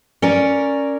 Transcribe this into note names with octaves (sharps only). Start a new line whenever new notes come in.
C#4 A#4 D5